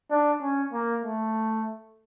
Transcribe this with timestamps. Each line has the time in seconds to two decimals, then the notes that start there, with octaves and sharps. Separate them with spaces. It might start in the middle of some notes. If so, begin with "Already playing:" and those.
0.10 D4
0.42 C#4
0.73 A#3
1.04 A3